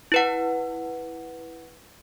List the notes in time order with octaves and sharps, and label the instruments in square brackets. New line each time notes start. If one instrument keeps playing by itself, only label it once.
[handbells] E4 B4 F#5